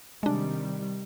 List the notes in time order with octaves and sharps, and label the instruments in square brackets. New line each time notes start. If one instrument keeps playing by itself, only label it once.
[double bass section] C3 D#3 G3 [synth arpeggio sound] G#3 D4